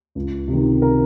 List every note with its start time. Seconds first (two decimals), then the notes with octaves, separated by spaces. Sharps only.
0.15 C#2
0.48 C3
0.53 D#3
0.82 A#4